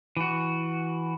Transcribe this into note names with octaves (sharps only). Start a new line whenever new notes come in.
E3 F#4